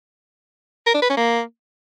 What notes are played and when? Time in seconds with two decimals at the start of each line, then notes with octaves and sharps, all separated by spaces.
0.86 A#4
0.94 D4
1.02 B4
1.09 C#4
1.17 A#3